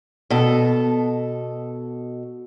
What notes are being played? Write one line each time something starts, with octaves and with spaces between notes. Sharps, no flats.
B2 A4